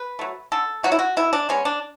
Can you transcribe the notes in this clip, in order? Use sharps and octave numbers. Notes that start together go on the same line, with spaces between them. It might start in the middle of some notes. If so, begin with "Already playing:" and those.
Already playing: B4
F#3 A3
D3 A4
F#3 A3 F#4
E4
F#4
B2 E4
D4
G#3 B3 C#4
D4